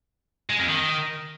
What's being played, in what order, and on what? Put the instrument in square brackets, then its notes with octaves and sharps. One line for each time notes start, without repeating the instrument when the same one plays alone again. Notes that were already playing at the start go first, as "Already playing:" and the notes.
[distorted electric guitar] G#3
F2
D#3